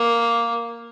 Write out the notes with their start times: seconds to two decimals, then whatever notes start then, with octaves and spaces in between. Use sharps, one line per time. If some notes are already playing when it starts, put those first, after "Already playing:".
Already playing: A#3